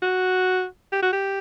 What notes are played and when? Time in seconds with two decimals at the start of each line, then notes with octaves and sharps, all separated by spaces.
0.02 F#4
0.92 G4
1.02 F#4
1.13 G4